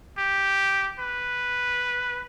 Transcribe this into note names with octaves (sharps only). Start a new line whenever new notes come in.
G4
B4